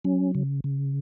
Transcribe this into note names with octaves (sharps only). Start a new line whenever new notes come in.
F#3 C#4
C#3
C#3